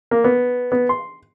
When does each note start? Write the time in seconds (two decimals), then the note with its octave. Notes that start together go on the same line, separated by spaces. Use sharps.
0.11 A#3
0.24 B3
0.72 B3
0.89 C6